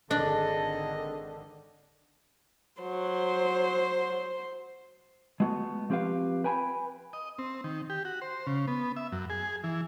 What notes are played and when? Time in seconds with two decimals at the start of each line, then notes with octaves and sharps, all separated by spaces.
0.11 G#1 D3 D#3 D4 G#4 A4 D#5
2.82 F#3 C5
5.40 G#3 A3 B3 F#4
5.90 F3 C4 G4 A#4 B4 F5
6.44 B4 G5 G#5 A#5 B5
7.13 D#5
7.38 C4
7.64 D#3
7.90 G4
8.05 F#4
8.22 C5
8.47 C#3
8.67 B3
8.96 E5
9.12 F#2
9.30 G#4
9.63 E3